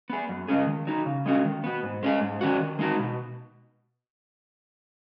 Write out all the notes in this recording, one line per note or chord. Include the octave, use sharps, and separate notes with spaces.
B3 G#4
F#2
C#3 G#3 C#4 G#4
D#3
F#3 D#4
C#3
G#3 C#4 F#4
D#3
B3 F#4
G#2
G#3 C#4 G#4
G#2
D#3 F#3 C#4 F#4
D#3
G#3 D#4 F#4
B2